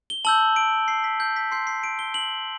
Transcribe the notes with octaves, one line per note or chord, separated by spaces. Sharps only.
G7
A5 E6 G6 F#7
D7
C7
B6
G6
B6
C6 G6 C7
C7
D7
G7
F#7